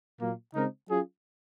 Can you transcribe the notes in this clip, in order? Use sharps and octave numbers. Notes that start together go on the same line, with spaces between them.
A#2 F#3 A#3
C#3 G#3 C4 D#4 A#4
F#3 C#4 F4 G#4